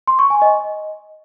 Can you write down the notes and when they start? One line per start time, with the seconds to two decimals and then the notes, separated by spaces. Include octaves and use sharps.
0.07 C6
0.19 C#6
0.30 G#5
0.42 D#5